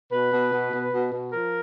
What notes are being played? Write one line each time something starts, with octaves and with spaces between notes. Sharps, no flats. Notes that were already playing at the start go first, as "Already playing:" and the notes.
B2 B4
B2
B2
B2
B2
B2
F3 A#4